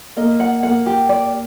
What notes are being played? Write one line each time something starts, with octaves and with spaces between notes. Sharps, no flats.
A#3 D#5
F#5
A#3 F#5
G4
D5